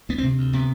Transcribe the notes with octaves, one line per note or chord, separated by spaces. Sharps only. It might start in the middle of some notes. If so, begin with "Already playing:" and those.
D2 B3
C4
C3
D2
C3 B3